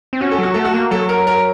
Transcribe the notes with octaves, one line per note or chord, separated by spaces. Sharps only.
C4
C#4 F#4
A4
F#3 F#4
A3 A4
F#4
A#3
F#3 A4
A#4
A#4